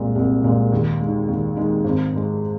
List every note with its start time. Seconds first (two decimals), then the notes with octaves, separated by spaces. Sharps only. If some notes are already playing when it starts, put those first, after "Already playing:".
Already playing: C2 A#2 G#3
0.16 C2
0.44 A#2 G#3
0.72 D#2
1.00 D#3 G#3
1.28 D#2
1.56 D#3 G#3
1.84 G#1
2.13 G#2 G#3